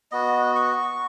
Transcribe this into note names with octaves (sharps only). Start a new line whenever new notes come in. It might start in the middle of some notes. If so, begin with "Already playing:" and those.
B3 F#4 D#5
C#6